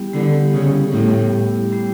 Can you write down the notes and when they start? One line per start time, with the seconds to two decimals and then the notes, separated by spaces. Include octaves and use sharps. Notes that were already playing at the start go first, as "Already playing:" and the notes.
Already playing: G3 B3 E4 G4
0.13 D3 G3 B3 E4 G4
0.53 C#3
0.93 A2 G3 B3 E4 G4
1.72 G3 B3 E4 G4